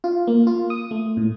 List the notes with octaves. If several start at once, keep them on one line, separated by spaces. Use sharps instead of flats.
F4
A#3
F4
D#6
A3
A2